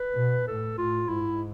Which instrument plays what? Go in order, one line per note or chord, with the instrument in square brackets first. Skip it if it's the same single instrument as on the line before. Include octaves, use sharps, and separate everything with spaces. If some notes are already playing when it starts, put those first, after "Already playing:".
Already playing: [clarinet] B4
[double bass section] B2
[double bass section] A2 [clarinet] A4
[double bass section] A2 [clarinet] F4
[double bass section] G#2 [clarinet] E4